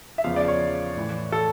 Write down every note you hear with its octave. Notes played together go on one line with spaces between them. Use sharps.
E5
E2 C#3 F3 F5
D5
C#5
A2 E3
A4